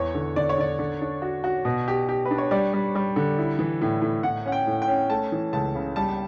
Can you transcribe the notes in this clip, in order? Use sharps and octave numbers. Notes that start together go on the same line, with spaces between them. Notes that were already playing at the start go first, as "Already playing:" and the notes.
Already playing: E2 C#5
D3
D3 D5
C#5
D3 D5
D3
D4
F#4
F#4
B2
G4
G4
B4
D4
C#5
G3 D5
G3
G3
D3
E4
E3
A2
A2
A2 F#5
C#4 F#5
G5
A2
G5
C#4
A3 A5
E3
C#2 A5
C#3
G3 A5